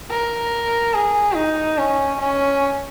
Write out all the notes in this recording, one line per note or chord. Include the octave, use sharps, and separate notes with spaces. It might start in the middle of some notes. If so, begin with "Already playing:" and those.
A#4
G#4
D#4
C#4
C#4